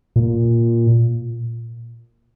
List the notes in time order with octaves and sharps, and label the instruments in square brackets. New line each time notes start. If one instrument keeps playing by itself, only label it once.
[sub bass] A#2